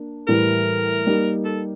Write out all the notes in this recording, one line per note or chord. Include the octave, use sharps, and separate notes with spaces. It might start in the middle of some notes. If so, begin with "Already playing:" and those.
Already playing: A#3 D4
A2 E3 G3 A#4
G3 A#3 D#4
A4